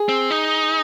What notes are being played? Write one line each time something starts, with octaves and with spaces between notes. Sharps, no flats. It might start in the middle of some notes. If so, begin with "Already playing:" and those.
Already playing: G#4
C4
D#4